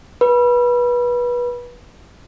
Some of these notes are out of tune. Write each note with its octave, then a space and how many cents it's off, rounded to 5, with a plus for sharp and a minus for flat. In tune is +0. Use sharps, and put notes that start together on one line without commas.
B4 -25